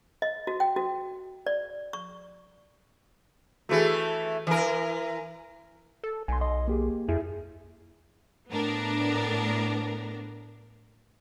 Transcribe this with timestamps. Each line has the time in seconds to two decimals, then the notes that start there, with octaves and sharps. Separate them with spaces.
0.22 D#5
0.47 F#4
0.60 G5
0.76 F#4
1.47 D5
1.93 C#6
3.69 E3 A3 F#4 G#4 A4
4.47 E3 A#4
6.03 A4
6.28 B1 G#5 C6
6.41 D#5 C6
6.68 A#3 G4 G#4
7.09 F2 E4 G#4 E5
8.51 A2 B3 D4 A#4